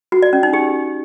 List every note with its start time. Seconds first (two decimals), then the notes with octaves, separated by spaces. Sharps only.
0.12 F#4
0.22 D5
0.33 C#4
0.43 D#4
0.53 G4